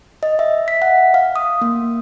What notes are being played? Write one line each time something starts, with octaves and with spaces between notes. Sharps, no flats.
D#5
E5
B6
F#5
F5
D#6
A#3